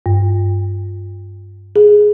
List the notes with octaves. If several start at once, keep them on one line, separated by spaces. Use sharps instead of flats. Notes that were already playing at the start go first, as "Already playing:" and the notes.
G2
G#4